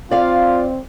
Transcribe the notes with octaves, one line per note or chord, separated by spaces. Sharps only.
C4 F4 D5 F5